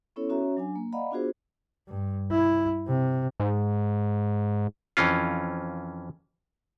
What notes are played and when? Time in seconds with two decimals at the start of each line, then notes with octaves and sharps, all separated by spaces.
0.16 B3 C#4 E4 A4 C#5
0.29 C#4 F#4 C#5 E5 A#5
0.57 F#3 D4 G#5
0.75 A#3
0.93 D5 D#5 F5 F#5 A#5 B5
1.11 B3 D4 F4 F#4 G#4 C5
1.88 G2
2.31 E4
2.87 C3
3.40 G#2
4.97 F2 E3 C#4 F4